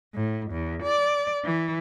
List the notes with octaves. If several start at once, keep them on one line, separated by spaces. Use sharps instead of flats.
A2
E2
D5
E3